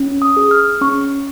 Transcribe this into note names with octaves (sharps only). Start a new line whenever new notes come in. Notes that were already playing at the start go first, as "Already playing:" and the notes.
Already playing: C#4
D#6
G#4
F6
C#4 C#6